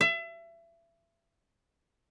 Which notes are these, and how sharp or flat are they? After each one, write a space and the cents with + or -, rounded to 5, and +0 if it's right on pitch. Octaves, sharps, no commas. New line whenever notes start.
E5 +30